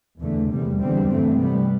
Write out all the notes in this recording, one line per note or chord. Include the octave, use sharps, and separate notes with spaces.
E2 D3 A3
E2 C3 G3
E2 D3 G3 C4
G2 E3 A3 C4
C3 G3 B3